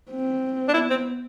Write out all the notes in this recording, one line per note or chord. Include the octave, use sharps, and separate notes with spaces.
C4
D4
B3 E4
C4